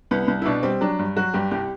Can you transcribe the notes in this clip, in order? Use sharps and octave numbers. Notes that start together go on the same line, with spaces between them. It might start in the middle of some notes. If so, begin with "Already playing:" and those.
C2 B3
C2
E4
B2 D4
G3 C4
F#3 D4
G2
F#3 F#4
G2 G4
C2 G4